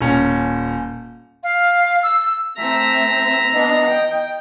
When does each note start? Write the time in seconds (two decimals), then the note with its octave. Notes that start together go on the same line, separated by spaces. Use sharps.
0.01 D#1 C#4
1.43 F5
2.03 E6
2.59 A3 C4 E5 A#5
3.53 B3 D4 D#5
3.87 G5